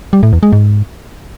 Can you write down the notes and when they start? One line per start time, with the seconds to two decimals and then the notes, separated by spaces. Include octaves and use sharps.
0.13 G3
0.23 A2
0.33 E2
0.43 G#3
0.53 G#2